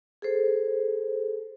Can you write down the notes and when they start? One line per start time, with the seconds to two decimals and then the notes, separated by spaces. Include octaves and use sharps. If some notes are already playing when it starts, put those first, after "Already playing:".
0.22 G#4 A4 C5